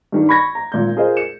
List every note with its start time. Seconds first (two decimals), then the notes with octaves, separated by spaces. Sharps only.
0.12 G2 D#3 G3
0.29 B5 C#6 G#6 A#6
0.55 A#5
0.72 G#1 A#2 G6
0.96 F4 G#4 A#4 C5 D#5
1.17 C#7 E7